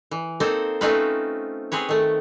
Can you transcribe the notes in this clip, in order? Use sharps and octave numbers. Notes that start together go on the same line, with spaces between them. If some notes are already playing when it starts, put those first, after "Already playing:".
E3
A#3 C4 D#4 A4 C5
A3 C4 C#4 D#4 F4 B4
C4 G#4 B4 C#5
D#3 A3